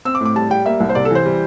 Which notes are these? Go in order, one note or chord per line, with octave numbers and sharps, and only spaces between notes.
C4 E6
D6
A2
D6
G3 A5
G3 G5
A#3 E5
C2
C5
C3 D5
A4
E3 C5
G3